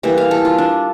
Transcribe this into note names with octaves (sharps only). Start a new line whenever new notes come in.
E3 G3 A#3 E5
F5
A4
F4
D4